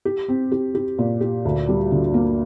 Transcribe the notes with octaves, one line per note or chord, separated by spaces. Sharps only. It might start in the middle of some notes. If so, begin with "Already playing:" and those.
G4
C4
G4
G4
A#2
G4
D2
G3
D3
A#3